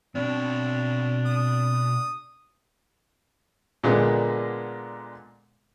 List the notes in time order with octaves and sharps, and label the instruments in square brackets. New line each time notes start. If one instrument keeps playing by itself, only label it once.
[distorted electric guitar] B2 C#5 [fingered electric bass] C4 [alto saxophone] D4
[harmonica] D#6
[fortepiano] A#2 D3 G#3 A#3 B3